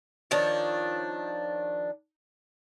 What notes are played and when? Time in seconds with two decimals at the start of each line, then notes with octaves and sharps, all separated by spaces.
0.31 D#3 F3 D4 C#5